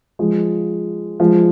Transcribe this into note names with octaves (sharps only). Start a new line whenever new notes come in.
F3 G#3
F3 G#3